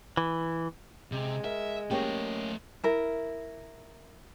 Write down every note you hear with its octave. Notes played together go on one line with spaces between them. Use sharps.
E3
C3 G#3
A#4 E5
A3 A#3 C#4 G4 D#5
E4 A#4